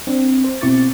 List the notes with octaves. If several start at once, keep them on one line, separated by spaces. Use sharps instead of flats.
C4 D4
C5
B2 C4 E4 C#6 D6 A6